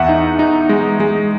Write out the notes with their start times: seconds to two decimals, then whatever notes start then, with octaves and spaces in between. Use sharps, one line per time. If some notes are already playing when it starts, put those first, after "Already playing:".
Already playing: E2 E5 F#5
0.09 D#4
0.39 D#4
0.69 G#3
1.00 G#3